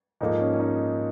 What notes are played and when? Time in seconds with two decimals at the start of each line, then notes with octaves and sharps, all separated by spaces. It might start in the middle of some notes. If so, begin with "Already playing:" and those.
0.21 G#2 F3 A#3 D#4
0.39 C#4
0.53 C#4
0.59 D#4